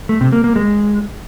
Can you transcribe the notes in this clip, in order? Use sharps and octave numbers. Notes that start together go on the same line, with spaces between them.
A3
C3
A#3
A#3
G#3